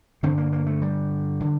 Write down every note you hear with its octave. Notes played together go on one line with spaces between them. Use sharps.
G2 D3 C4
A#3
A#3
A3
G3
D3